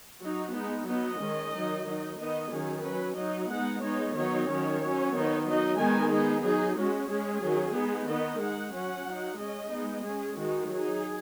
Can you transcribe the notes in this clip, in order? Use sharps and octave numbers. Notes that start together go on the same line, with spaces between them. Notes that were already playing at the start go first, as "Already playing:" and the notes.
F#3 D#4 F#4
G#3 B3 D#4
F#3 B3 D#4 D#5
D#3 G#3 C#4
D#3 F#3 D#4
D#3 F#3 D#4
D#3 B3 D#4 D#5
D#3 F#3 C#4 G#4
F#3 C#4 B4
F#3 D#4 D#5
G#3 B3 D#4 F#5
G#3 B3 D#4 C#5
D#3 F#3 B3 D#4 C#5
D#3 F#3 C#4 C#5
F#3 C#4
D#3 B3 D#4
F#3 D#4 D#5
D#3 G#3 B3 D#4 G#5
G#3 B3 D#4 G#4
F#3 D#4 G#4
G#3 C#4 F#4
G#3 C#4 G#4
D#3 F#3 C#4
G#3 B3 D#4
D#3 B3 D#4 D#5
G#3 D#4 F#5
F#3 C#4 F#5
F#3 D#4
G#3 C#4 D#5
G#3 B3 D#4
G#3 C#4 G#4
D#3 G#3 D#4 F#4
F#3 D#4 G#4